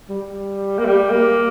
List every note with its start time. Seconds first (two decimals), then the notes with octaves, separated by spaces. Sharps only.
0.09 G3
0.79 A#3
0.86 G3
1.11 A#3